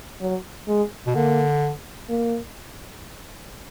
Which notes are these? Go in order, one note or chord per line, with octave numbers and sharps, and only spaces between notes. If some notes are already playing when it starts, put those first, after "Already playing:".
F#3
G#3
B2
D3 A#3
A#3